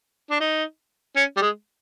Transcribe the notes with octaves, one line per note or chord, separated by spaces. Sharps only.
D4
D#4
C#4
G3
G#3